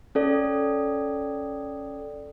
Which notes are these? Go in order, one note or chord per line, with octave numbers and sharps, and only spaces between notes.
C#4 A4 D5